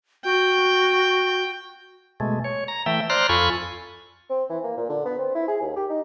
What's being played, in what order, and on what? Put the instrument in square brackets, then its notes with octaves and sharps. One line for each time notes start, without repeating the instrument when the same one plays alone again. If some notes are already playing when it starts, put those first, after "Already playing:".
[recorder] F#4 [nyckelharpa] G5
[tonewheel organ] B2 G#3 A3
C#5
A#5
E3 A3 E5 G5
C5 D5 A#5 C6 F6 F#6
F2 F4 A4 G#5 B5 C#6
[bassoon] C4
E3
A#3
A#2
D3
B3
C4
E4
G#4
D#2
G4
D#4